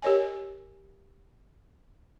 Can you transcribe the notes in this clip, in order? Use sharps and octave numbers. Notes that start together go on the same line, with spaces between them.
G4 A#4 C#5 D#5 G#5